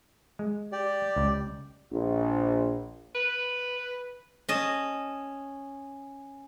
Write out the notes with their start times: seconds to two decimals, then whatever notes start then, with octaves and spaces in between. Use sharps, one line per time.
0.39 G#3
0.72 G4 D5
1.16 C#2
1.91 A#1
3.15 B4
4.49 C#4 D#5 A5